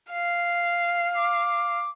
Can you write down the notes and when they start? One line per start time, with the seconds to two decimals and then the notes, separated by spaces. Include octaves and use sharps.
0.13 F5
1.16 D6